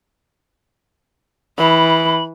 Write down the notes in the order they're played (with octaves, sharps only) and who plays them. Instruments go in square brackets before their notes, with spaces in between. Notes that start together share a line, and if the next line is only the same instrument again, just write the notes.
[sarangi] E3 [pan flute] B5